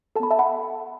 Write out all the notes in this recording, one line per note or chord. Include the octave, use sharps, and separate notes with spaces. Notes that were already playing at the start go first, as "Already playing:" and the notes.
B3 A4 A5 B5
E5 A5
F#5 B5